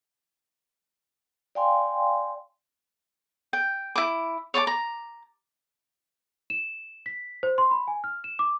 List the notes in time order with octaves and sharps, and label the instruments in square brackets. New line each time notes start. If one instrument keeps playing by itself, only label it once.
[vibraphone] D5 F5 G5 G#5 C6
[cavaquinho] G5
E4 D6
C#5 D5 A5 D6
A#5
[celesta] E7
B6
C5
C6
B5
G#5
F6
E7
D6